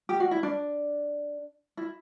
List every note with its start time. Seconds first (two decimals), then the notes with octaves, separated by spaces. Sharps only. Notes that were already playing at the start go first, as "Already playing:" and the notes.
0.09 G4
0.20 F#4
0.31 E4
0.43 D4
1.77 E4